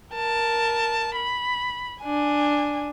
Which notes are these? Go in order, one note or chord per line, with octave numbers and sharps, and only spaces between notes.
A#4 A5
B5
D4 G#5